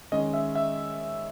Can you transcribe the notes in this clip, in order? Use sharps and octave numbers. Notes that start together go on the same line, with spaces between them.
D#3 G#3 C#4 D#5
E5
E5